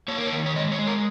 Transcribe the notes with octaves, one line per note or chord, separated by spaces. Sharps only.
A#3 C#5
A#4
C#5
D#3
C#5
G#3 D#5
C#5
G#3
A#4